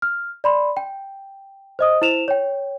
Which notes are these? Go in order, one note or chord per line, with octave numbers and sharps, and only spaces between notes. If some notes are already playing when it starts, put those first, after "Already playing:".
F6
D5 B5 C6
G5
C5 D#5 D#6
E4 C5 E7 F7
C#5 G5